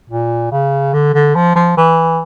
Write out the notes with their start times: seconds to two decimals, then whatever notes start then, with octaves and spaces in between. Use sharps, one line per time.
0.10 A#2
0.51 C#3
0.93 D3
1.14 D3
1.35 F3
1.56 F3
1.77 E3